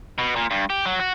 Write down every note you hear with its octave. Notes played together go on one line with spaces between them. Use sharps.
B2
A#2
G2
G4
F#3
F#4